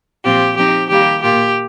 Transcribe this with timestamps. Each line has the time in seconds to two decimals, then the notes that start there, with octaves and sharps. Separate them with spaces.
0.24 A#2 F3 C4 F4 G4
0.56 F3 C4 D#4 G4
0.89 D#3 G3 A#3 G4
1.22 A#2 A#3 F4 G4